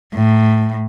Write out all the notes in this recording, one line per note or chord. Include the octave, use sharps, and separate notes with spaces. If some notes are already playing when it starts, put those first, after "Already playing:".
A2